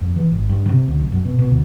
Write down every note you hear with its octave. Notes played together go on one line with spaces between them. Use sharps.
F2
E3
G#1
G2
C3
D2
B1
F#2
B2
B2
D2